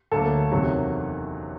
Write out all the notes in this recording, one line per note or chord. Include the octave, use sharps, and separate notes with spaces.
D2 D3 F#3 A#3 A4
F#1 E2 C3 D#3 F#3